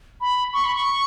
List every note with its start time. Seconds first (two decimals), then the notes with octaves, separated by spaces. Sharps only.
0.21 B5
0.53 C#6
0.64 B5
0.76 C#6